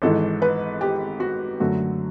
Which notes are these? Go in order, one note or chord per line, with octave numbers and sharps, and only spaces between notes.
G#1 G#2 E3 A4
B4
G4
F#4
F#2 D3 F#3 A3 F#4